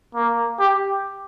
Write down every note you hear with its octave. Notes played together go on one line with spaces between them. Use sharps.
A#3
G4